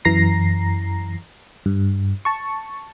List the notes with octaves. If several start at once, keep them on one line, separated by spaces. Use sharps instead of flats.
F#2 E3 A#5 A#6 C7
G2
A5 C#6